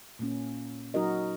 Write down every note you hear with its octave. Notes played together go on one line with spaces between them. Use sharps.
A#2 A#3 C#4
F#3 D#4 F#4 A#4 D#5